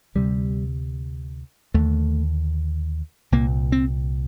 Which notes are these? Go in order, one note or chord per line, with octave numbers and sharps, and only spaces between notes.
D2 C3 G3
D#2 D3 A3
C2 A#2 A#3
C4